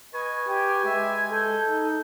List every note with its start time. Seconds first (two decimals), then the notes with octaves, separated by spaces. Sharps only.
0.14 B4 D#5 G#5 C#6
0.49 G4 G5 G#5
0.85 G#3 E5
1.32 A4 G6
1.67 D#4